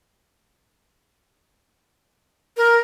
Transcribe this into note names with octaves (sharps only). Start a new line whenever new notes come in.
A#4